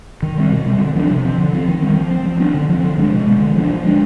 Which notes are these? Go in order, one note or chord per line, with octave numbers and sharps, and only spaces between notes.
D#3
G3 C4
B2
G3 C4
D3
F3 B3 D4
C3
F3 C4
D3
F3 C4
D#3
G3 C4
F3
C4
F3
B3 D4
D3
F3 C4
D3
F3 G#3 D4
B2
G#3 B3
D3
F3 B3 D4
F3
G#3 D4